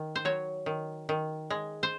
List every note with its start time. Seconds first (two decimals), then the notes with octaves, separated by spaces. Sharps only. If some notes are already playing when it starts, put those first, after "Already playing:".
Already playing: D#3
0.16 C5
0.25 F#3 C#5
0.66 D#3
1.09 D#3
1.50 G#3
1.83 C5